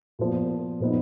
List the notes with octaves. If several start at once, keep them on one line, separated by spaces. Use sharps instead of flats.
A#2 F3 B3
A#2 F3 B3 D#4